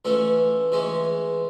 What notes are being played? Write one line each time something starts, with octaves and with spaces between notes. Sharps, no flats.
E3 A3 C#4 F4
E3 G#3 C#4